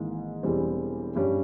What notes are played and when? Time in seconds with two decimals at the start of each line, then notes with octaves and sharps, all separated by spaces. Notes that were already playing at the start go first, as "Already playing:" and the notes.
Already playing: G#1 G#2 E3 A#3
0.43 E1 E2 E3 G3 C4
1.16 G2 G3 C#4